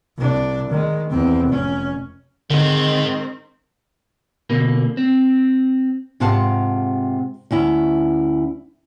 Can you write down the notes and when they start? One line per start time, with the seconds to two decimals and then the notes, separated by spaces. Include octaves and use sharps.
0.18 C2 D4
0.69 D#3 G#3
1.10 E2 C4
1.48 F1 C#4
2.50 G#2 D3 D#3 G#3 C4
4.50 B2 D3 A#3
4.97 C4
6.20 G#2 C3 F4 F5 F#5 A5
7.51 D2 C#4 E4